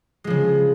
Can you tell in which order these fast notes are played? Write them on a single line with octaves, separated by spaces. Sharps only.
G#3 F3 C#3